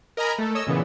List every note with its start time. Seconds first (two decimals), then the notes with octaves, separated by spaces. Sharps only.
0.17 A#4 D#5 G#5 A#5 B5
0.38 A3 A4
0.55 C#5 D#5 E6
0.67 A#2 C#3 E3 B3